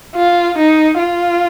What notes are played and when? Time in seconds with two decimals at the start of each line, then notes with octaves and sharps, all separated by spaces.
0.16 F4
0.58 D#4
0.99 F4